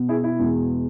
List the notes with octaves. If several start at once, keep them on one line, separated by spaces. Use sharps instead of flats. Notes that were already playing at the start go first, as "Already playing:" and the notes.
Already playing: B2 B3
E4 G#4
E4
E2 B2 G#3